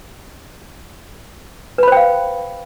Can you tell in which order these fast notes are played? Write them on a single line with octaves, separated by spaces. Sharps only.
B4 B5 C5 G5 F5